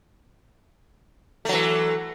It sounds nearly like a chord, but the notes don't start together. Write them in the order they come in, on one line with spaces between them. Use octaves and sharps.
A3 F#3 E3